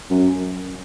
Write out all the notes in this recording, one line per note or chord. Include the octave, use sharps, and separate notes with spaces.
F#2